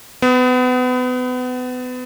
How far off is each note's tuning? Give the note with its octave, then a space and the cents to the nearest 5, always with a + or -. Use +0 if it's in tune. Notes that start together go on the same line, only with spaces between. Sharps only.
B3 +30